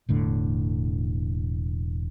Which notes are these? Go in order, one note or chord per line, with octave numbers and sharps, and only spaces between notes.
E1 A2 D3